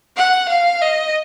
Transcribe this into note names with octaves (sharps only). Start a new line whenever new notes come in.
F#5
F5
D#5